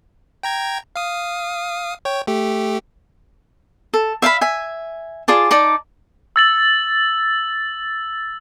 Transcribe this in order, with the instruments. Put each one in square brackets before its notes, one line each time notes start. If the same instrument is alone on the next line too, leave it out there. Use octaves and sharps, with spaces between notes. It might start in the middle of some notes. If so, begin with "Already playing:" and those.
[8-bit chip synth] G5 A#5 G#6
F5 D#6
C#5 G5
A3 G4
[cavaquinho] A4
E5 F5 G#5 B5
E5 G#5
F4 G#4 D5 A5
D#4 D5 A5
[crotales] E6 A6 F#7